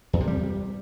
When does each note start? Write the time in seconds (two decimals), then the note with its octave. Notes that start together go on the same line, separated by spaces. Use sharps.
0.13 E2
0.20 C3
0.27 G3